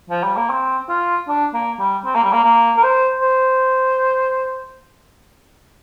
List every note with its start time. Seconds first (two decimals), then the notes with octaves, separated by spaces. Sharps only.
0.10 F3
0.24 G3
0.37 A#3
0.50 C4
0.89 F4
1.28 D4
1.54 A#3
1.79 G3
2.05 C4
2.15 A#3
2.24 G3
2.33 A#3
2.44 A#3
2.77 A#4
2.84 C5
3.21 C5